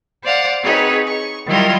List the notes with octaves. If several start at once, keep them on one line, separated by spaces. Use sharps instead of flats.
C5 D5 F5 F#5
C4 D#4 F#4 G#4 B4 C#5
C#6
D#3 F#3 G3 E4 F4 A#4